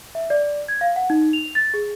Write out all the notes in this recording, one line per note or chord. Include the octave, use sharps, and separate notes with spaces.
E5
D5
G#6
F5
F#5
D#4
F7
A6
G#4